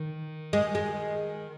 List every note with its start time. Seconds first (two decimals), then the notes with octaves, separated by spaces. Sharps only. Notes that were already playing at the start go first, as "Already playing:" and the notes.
Already playing: D#3
0.53 G#3
0.75 G#3